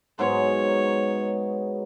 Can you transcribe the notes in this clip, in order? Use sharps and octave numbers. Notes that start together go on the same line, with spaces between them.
G#2 F#3 B3 C#5